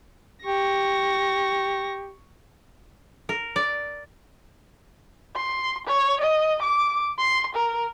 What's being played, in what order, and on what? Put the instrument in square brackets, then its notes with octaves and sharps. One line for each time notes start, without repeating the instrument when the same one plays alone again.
[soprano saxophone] G4 [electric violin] C#6 A#6
[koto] A#4
D5
[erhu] C6
C#5
D#5
D6
C6
A#4